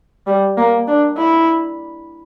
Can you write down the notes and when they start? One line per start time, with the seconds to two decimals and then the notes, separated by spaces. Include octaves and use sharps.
0.27 G3
0.57 A#3
0.87 D4
1.17 E4